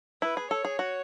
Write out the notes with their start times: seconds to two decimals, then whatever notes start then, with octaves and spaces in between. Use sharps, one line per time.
0.22 E4 B4
0.37 G#4
0.50 A4 C#5
0.65 G#4
0.79 F#4